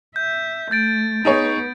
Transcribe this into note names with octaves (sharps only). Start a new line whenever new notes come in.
E5 G6
A3 G6 A6 D7
B3 D#4 G#4 C#5